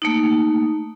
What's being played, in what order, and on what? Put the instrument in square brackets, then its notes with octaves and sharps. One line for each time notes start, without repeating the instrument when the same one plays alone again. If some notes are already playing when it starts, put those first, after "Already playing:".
[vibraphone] A3 A#3 D#4